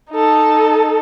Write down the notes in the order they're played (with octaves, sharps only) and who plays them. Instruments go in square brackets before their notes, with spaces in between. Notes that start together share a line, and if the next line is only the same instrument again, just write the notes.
[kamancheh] D#4 A4